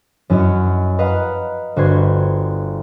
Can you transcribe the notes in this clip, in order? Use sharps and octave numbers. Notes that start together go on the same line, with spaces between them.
F#2 F#3 E4 F#4 D#5 F6
B4 D#5 F5 F#5 A#5
G1 F#4 B4 C5 C6 G#6